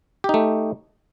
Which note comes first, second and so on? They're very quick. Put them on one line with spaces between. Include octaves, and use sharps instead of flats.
G4 D#4 A3